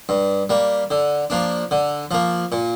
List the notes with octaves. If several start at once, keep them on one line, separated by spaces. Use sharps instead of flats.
G2
G3 A#3
D3
F3 A#3 D4
D3
F3 A#3
A#2